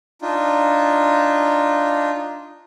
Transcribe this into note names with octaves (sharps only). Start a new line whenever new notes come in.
D4 D#4 F4